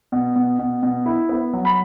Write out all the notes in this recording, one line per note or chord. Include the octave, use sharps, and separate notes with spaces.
B2
B2
B2
B2
E4
B3
F#3
B5